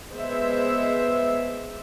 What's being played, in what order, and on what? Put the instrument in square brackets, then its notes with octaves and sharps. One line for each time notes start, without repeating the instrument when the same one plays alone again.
[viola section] G#3 B3 C5 E5